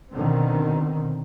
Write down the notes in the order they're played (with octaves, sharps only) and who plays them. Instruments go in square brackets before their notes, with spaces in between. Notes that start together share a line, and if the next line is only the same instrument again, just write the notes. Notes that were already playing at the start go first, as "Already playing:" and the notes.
[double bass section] B2 D3 D#3 C4